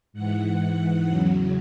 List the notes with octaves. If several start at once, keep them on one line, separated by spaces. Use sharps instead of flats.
G#2 E3 F#5
E2 C#3 F#3